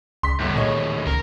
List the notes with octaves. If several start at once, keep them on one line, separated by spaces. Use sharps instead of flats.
C#2 C6 B6
G1 D#2 A2
A#2 G#3 C#5 D#5
C#2 A#4